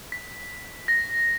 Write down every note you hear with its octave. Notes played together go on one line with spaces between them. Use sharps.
B6
A#6